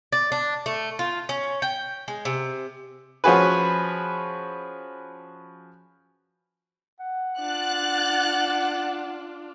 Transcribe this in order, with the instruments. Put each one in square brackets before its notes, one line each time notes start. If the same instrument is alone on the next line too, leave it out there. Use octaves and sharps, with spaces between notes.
[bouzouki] D5
D4
A3
F4
C#4
G5
G#3
C3
[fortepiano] F3 C#4 F#4 G#4 B4
[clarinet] F#5
[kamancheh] D4 F4 [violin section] F#6 A6